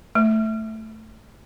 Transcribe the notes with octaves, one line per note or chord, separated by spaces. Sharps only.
A3